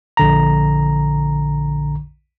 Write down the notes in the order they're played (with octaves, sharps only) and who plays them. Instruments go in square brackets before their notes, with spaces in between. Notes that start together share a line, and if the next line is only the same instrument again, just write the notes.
[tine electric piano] A#1 D3 A#5